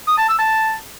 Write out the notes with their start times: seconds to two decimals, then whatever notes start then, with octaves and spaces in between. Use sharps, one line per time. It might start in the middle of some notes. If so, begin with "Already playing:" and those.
0.07 D#6
0.18 A5
0.28 E6
0.39 A5